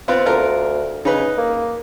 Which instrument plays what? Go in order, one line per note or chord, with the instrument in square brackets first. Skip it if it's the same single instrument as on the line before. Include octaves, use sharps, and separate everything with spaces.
[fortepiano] B3 C4 F4
[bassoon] D2 [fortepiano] F4 A#4
[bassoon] C#3 [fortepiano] D#4 B4
[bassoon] A#3